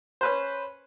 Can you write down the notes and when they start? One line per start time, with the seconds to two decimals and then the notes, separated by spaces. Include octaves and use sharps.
0.21 C#4 B4 C5